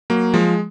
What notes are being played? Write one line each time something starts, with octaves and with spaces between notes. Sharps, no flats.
F#3 A#3
F3 G#3